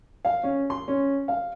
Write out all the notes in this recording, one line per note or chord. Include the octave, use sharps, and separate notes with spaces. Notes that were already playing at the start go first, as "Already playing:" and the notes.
F5
C#4
C6
C#4
F5